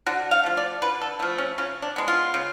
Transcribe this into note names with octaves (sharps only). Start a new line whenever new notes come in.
D3 F#4
F5
F3 A3
D5
D3 B4
A4
F3 A3 B3
C#4
C#3 C#4
D4
G#3 B3
F4
C#3